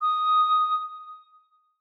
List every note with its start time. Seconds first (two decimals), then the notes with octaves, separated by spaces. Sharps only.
0.02 D#6